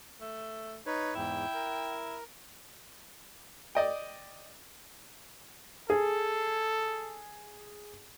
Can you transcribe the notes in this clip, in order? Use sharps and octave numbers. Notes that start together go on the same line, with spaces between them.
A3
D#4 B4 C#5
E2 G#2 E4 G5
A#4
D5 D#5 G5
G#4 A4